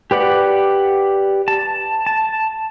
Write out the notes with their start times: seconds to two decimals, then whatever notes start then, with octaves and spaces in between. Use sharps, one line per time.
0.11 G4 B4 D5 F#5
1.48 A5
2.06 A5